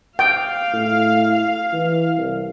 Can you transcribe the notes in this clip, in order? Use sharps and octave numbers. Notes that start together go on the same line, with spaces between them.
F5 G5
A2
E3
C2